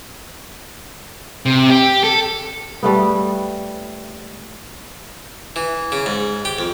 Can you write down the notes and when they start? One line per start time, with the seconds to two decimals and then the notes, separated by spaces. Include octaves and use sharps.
1.46 C3
1.70 G4
2.04 A4
2.83 G3 A3 B3
5.56 E3
5.92 C#3
6.06 G#2
6.45 G4
6.59 F2